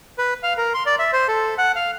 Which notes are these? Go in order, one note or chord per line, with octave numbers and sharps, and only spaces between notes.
B4
F5
A#4
C6
D5
E5
C5
A4
F#5
F5